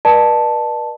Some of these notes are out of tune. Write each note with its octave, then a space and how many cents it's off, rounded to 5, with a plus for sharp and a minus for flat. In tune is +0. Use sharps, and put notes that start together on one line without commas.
B4 -40 D5 +40 A5 +0